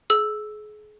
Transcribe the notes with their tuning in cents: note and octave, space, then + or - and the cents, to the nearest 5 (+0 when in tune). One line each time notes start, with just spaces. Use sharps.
G#4 +35 E6 +0